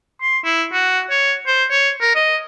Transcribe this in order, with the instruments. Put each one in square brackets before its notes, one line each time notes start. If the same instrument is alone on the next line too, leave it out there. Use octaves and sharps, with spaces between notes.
[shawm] C6
E4
F#4
C#5
C5
C#5
A#4
D#5